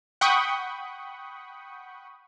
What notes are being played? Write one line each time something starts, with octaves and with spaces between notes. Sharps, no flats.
F#5 G5 B5 C#6 D#6